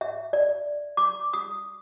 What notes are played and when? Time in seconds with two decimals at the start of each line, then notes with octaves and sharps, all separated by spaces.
0.01 E5
0.33 D5
0.97 D6
1.33 D#6